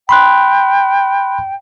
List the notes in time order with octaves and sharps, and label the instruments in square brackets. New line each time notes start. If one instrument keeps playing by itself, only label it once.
[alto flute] G5 [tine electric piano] B5 C6 F#6